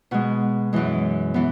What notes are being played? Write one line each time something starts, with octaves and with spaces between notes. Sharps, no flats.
B2 G#3 F#4
F#2 E3 G#3
E3 B3